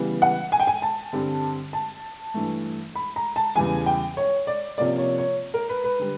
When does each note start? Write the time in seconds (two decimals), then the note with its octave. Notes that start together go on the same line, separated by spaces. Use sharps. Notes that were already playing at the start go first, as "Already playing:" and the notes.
Already playing: C#3 E3 G3 B3
0.22 F#5
0.52 G#5
0.60 G5
0.67 G#5
0.82 A5
1.13 G2 D3 G3 C4
1.73 A5
2.34 G2 E3 A3
2.95 B5
3.16 A#5
3.36 A5
3.56 E2 C#3 E3 G3 G#5
3.86 G5
4.17 C#5
4.47 D5
4.78 C3 F3 A#3 C#4 D5
4.98 C#5
5.18 C#5
5.54 A#4
5.69 B4
5.84 B4
5.99 D3 G3